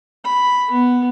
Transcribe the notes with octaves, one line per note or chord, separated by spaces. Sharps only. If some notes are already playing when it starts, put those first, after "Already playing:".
B5
B3